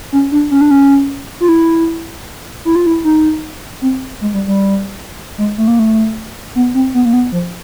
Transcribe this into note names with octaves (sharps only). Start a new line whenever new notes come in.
C#4
D4
C#4
D4
C#4
F4
E4
E4
F4
E4
D#4
C4
G#3
G3
G3
G#3
A3
A#3
A3
B3
C4
B3
A#3
B3
F3